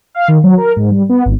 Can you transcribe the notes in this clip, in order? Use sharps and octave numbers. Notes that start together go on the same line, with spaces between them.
F5
D#3
F#3
A#4
G#2
G3
B3
G#1